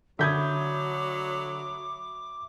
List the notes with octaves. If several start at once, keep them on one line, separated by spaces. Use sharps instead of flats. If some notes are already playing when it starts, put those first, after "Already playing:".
D3 F#3 E5 B5 D6 D#6 G6 G#6